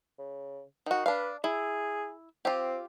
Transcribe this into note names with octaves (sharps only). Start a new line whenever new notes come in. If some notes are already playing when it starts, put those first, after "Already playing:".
C#3
D#3 D#4 F#4
D4 B4 F5
E4 G#4
C4 F4 G4